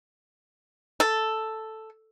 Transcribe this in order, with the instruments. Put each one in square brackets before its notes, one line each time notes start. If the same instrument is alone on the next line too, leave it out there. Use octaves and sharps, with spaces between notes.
[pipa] A4